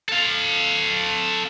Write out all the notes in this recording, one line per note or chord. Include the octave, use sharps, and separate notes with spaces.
A4 F5